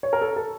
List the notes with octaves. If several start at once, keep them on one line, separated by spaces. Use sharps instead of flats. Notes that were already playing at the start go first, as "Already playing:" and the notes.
C#5
A#4
A4
A4